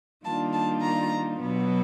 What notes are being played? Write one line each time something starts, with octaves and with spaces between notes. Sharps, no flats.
D#3 G3 A#3 D4 F4 A5
A5
A#5
B2 F#3 B3